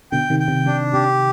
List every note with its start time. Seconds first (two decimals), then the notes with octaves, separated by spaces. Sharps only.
0.12 B2 D3 G5
0.30 C3 D#3
0.39 G5
0.48 C3
0.66 C3 D4
0.93 C3 G4